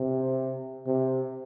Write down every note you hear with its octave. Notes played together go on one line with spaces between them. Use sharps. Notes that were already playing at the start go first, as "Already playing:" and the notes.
Already playing: C3
C3